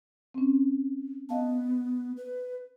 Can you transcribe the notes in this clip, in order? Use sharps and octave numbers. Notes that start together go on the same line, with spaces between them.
C4 C#4
B3 D#5 F5 A5
B4